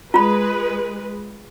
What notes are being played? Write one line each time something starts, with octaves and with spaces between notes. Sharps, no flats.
G#3 F4 B4 B5